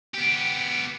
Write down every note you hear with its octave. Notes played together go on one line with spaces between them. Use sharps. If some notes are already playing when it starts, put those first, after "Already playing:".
B3 G4